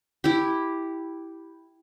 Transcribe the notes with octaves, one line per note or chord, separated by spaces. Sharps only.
E4 G4